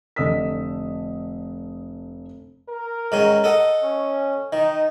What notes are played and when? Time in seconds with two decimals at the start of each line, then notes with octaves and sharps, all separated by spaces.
0.16 F1 D3 D#5 D#6 E6 B6
2.69 A#4
3.12 G#2 D#3 C#4
3.44 A4 D#5 F#5
3.83 C#4
4.53 D#3 D#4